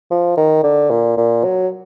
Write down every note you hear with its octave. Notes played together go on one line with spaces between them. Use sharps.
F3
D#3
D3
A#2
A#2
F#3